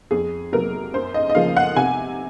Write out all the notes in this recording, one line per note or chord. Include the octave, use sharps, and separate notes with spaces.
F2 G#4
C3 F#3 A#3 A#4
F#2 C5
D#5
D#5
C#3 F3 A#3 F5
F#5
C3 G#5